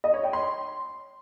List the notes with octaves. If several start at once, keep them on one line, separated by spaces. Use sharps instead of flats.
D#5
C#5
G5
C6